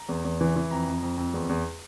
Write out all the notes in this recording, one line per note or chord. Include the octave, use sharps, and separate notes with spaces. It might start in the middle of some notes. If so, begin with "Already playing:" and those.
Already playing: A#5
E2
E2
E3
E3
F2 A#5
F2
F2
F2
E2
E2